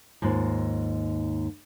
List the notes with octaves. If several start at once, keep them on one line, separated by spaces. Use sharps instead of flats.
D#2 G#2 F4